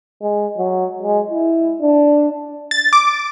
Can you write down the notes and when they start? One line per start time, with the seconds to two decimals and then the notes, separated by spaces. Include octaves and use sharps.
0.22 G#3
0.57 F#3
1.02 G#3
1.31 E4
1.82 D4
2.71 A6
2.93 D6